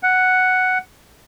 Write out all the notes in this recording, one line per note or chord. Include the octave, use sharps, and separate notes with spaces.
F#5